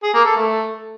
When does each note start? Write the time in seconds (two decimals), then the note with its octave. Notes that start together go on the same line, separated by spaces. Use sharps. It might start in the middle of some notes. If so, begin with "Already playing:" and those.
0.03 G#4
0.14 A#3
0.25 A4
0.36 A3